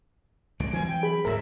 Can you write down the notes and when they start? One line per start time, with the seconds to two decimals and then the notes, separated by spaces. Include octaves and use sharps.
0.60 C2 G#3 D7
0.73 E3 F#3 C4 G#5
0.88 G5
1.03 G#4 B5
1.25 D1 G#2 G#3 A#4 E5